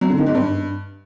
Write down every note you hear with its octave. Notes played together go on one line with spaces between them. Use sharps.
F#3
D3
D#3
G#2
G2